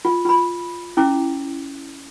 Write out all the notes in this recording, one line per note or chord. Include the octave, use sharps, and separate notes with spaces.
F4
F4 B5
C#4 E4 D6